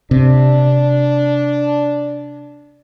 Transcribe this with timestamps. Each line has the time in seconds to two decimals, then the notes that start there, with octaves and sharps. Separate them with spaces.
0.11 C3 D4